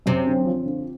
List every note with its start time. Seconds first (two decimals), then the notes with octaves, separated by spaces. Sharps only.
0.06 F#2 C3
0.26 D3
0.46 F3
0.66 D3